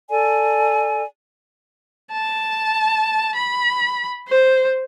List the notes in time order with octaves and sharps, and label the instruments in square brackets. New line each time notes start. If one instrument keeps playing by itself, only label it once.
[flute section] A4 D5 G#5
[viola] A5
B5
C5